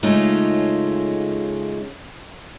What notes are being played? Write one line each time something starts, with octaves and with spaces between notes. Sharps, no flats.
C#3 G#3 A3 C#4 D#4 F4